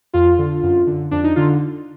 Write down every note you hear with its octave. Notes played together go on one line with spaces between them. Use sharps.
F2 F4
D3
F#2
D3
F2 D4
D#4
D3 F4